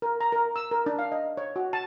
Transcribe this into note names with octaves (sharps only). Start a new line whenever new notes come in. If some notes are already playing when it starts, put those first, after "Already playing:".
A#4
A#5
A#4
E6
A#4
D4
F5
D#5
C#5
F#4
A5